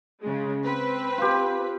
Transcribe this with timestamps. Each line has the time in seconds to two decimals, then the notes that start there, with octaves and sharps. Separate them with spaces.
0.23 C#3 G#3
0.65 C4 B4
1.18 F4 G4